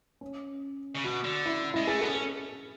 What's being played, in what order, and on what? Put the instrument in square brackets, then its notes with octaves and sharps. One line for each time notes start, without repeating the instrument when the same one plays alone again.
[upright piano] C#4
[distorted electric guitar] C#3
[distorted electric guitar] B2 [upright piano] F#4
[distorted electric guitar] D3
[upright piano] E4
[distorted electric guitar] G#3 [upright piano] E4
[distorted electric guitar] A3 [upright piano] G#4
[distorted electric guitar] B3 [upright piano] A4
[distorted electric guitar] C#4
[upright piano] A4